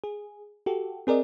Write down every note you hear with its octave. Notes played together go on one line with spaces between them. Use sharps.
G#4
F#4 G4 A4
C4 G#4 A#4 D5 D#5